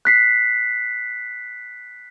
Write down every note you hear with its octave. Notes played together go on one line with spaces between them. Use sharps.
F#6 B6 C7